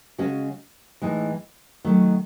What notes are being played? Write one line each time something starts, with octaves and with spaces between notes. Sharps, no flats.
C#3 G#3 C#4 F#4
A2 E3 G#3 D#4
D#3 F#3 A3